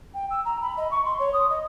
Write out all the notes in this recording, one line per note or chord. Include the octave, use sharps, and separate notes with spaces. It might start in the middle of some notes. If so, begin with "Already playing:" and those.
G5
E6
A#5
B5
D#5
C#6
C6
C#5
D#6
D#5